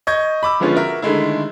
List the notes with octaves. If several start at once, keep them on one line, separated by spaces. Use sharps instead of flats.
D#5 C#6 G6 G#6
B5 D6 E6
D3 F3 G#3 B3 C#4 F4
F#4 A#4 E5
D3 D#3 G#3 A3 E4